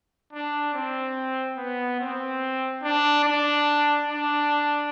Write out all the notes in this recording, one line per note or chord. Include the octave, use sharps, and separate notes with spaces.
D4
C4
B3
C4
D4
D4
D4